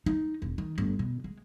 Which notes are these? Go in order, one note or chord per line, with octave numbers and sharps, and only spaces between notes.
D#4
E1
D#3
G1
B2
G#3